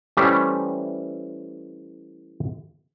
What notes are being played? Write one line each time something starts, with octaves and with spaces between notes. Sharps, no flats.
E3 G3 A3 C#4 G4 C5